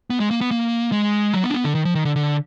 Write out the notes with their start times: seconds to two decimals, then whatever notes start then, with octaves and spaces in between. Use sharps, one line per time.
0.10 B3
0.20 G#3
0.31 A#3
0.41 B3
0.51 A#3
0.92 G#3
1.34 F#3
1.44 B3
1.50 D4
1.54 B3
1.64 D3
1.75 D#3
1.85 F3
1.95 D#3
2.05 D3
2.16 D3